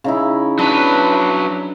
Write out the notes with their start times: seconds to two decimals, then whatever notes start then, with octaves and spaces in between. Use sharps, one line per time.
0.04 C#3 D#4 E4
0.59 F#3 D4 B4